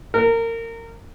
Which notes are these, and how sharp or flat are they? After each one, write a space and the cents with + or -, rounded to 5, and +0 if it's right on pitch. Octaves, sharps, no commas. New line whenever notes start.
A#4 -25